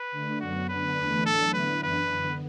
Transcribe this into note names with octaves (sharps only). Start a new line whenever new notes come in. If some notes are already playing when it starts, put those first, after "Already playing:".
Already playing: B4
D3 A3 D4
F#2 D3 F#3 B3 F#4
D3 B3 D4 B4
E2 E3 A3 D4
A2 F#3 A3 D4 A4
D3 B3 E4 B4
F#2 E3 D4 B4
F#2 D3 B3